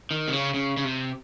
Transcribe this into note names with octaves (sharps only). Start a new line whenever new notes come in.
D#3
C3
C#3
C#3
C#3
C3